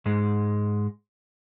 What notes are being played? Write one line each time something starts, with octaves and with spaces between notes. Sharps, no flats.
G#2 G#3